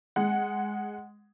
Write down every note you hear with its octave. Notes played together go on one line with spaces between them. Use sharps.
G#3 F#5